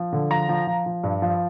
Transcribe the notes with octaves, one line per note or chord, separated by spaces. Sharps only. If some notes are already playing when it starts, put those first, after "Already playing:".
Already playing: F3
D3
F3 A#5
F3
F3
F3
G2
F3